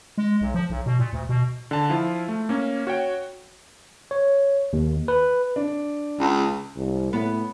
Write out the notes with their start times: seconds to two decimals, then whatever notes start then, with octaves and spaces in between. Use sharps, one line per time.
0.18 G#3
0.41 B1
0.54 F3
0.70 B1
0.86 B2
0.99 A#2
1.13 D2
1.29 B2
1.71 D3 A5
1.89 F3 E4 F4
2.28 A3
2.49 A#3 C#4
2.87 F#4 C#5 G5
4.11 C#5
4.73 D#2
5.08 B4
5.56 D4
6.19 C#2
6.76 C2
7.13 A2 B3